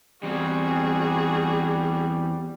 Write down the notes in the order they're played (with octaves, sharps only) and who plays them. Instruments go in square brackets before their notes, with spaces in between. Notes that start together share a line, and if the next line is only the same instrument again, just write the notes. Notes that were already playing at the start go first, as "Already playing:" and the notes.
[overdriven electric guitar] E2 C4 [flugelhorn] G3 [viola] F#4 G#4